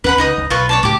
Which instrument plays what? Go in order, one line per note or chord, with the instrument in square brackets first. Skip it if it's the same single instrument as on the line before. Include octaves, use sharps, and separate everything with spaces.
[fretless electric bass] D#2 C#4 [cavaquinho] B4 F#5 B5
[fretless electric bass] C#2 [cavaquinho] D#4 D#5 D#6
[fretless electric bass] C#2
[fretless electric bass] B1 [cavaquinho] F4 B4 C#6
[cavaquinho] C#5 D5 A5
[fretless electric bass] C#2 A2 A3 [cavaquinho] G4 D6